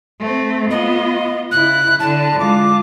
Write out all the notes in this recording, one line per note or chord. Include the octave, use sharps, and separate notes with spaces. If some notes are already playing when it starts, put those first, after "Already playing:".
A3 C4
B3 F4 D#5
C#3 E4 F#6
D3 A5
G#3 F4 D6